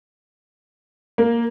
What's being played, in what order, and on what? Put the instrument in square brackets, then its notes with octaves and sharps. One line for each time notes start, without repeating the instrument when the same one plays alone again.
[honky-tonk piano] A#3